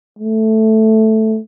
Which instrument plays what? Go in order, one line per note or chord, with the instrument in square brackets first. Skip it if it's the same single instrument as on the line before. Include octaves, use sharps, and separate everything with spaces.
[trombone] A3